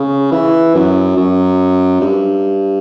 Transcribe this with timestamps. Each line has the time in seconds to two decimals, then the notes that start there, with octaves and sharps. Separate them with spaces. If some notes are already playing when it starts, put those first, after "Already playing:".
Already playing: C#3
0.32 E3
0.75 F#2
1.17 F#2
2.01 G2